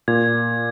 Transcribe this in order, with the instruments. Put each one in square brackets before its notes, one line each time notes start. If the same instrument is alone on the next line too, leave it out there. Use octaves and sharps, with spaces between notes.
[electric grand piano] A#2 [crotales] G#6